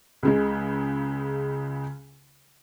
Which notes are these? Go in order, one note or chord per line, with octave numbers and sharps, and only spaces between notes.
C#2 C#3 G#3